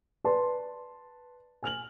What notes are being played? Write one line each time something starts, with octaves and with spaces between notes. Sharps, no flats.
B4 D5 A5 C6
G#5 F6 F7 F#7